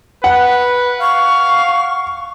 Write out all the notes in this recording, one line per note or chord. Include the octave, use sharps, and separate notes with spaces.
B4 F#5
F5 C#6